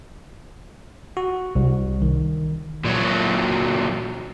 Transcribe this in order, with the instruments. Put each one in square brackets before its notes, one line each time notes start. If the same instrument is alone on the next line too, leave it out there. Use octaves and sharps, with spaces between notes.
[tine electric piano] F#4
C2
D#3
[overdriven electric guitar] A#2 F#3